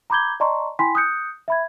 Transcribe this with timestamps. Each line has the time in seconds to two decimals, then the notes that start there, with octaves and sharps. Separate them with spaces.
0.10 A#5 B5 D6 G6 G#6 G7
0.40 D5 D#5 A5 A#5 C6 C#6
0.79 E4 G5 G#5 B5 C6 B6
0.95 D#6 F#6 G6 C#7
1.48 E5 B5 G#6